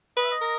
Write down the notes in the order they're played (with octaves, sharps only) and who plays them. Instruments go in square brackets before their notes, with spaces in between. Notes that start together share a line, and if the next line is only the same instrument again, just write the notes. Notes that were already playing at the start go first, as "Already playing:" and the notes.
[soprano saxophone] B4 [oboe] D#5
[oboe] E5
D#5
[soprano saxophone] A#4